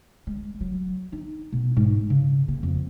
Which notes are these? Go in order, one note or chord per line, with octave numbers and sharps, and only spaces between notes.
G#3
F#3
D#4
B2
G#2
C#3
A#3
F2